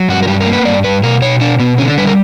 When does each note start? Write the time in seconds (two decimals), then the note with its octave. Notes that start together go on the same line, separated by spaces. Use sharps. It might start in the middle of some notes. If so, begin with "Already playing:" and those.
Already playing: F#3
0.09 G2 F#4
0.23 A#4
0.27 G2 G4
0.40 A#4
0.46 A#3
0.53 B4
0.65 G2 D5
0.84 G2 B4
1.03 B2 A#4
1.22 B2 C#5
1.40 B2 D4
1.59 B2 B3
1.78 D3 C#4
1.88 D4
1.98 G3 B4
2.07 A#4